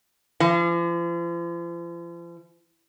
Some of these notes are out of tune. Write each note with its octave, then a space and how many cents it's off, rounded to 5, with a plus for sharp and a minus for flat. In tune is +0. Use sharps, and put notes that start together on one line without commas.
F3 -45